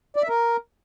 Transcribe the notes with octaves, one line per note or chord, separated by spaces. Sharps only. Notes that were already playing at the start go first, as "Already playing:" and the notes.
D5
E5
A#4